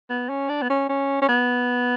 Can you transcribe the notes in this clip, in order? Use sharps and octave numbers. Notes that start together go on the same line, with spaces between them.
B3
C#4
D4
B3
C#4
C#4
C#4
B3